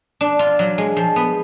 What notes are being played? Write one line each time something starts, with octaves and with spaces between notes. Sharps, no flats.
D4
F4
F#3
G#3
F3
B3